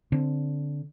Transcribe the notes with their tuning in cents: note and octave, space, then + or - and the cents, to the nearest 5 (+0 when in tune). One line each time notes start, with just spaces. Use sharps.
D3 -10 C4 +0